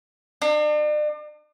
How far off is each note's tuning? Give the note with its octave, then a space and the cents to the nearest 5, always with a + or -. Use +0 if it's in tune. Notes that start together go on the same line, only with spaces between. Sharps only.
D4 +40